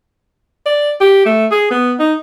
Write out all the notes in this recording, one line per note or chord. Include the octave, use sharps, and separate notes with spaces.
D5
G4
A3
G#4
B3
D#4